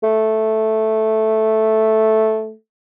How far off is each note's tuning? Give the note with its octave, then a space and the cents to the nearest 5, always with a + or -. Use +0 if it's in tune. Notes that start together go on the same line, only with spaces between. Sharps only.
A3 -5